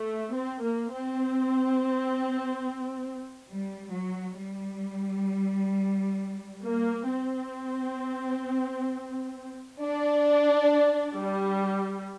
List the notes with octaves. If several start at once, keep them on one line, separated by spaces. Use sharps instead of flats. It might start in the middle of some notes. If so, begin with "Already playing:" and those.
Already playing: A3
C4
A#3
C4
G3
F#3
G3
A#3
C4
D4
G3